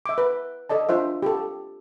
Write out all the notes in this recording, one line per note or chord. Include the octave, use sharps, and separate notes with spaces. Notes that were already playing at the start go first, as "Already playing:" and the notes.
E5 D6
B4
A4 D5 D#5 A5
D4 F4 C5 E5
G4 A4